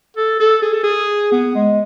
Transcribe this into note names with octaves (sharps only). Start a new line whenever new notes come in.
A4
A4
G#4
A4
G#4
B3
G#3